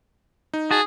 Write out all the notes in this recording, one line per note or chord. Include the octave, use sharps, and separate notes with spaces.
D#4
F#4 G#4 A5